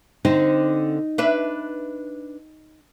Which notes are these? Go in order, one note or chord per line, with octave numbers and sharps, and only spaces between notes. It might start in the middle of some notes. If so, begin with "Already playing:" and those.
D3 C4 D#4
D4 B4 E5